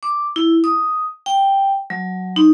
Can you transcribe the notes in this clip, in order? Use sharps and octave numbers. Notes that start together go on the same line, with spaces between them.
D6
E4
D#6
G5
F#3
D#4